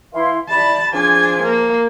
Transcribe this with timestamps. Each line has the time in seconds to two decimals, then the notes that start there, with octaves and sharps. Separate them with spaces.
0.13 E3 E4 F5 C6
0.49 G3 E4 D5 A5 B5
0.92 F3 D4 G#4 G#5
1.43 A#3